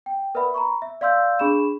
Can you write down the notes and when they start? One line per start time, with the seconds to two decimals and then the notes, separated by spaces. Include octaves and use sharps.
0.06 G5
0.35 A#4 B4 D5 E5 F#5 B5
0.54 A#5 B5 C#6
0.82 E5
1.01 D5 F5 C6 E6 G6
1.39 D4 G#4 B5 C#6 E7